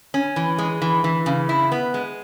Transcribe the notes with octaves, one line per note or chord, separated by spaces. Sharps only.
C#4
E3
G#3
E3
E3
C#3
E4
B3
G#3